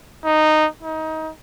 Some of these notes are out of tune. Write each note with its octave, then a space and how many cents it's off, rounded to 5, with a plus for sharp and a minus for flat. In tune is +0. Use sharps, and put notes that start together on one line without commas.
D#4 -10
D#4 +25